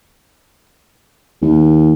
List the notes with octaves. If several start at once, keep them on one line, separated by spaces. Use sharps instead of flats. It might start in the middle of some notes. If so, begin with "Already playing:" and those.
D#2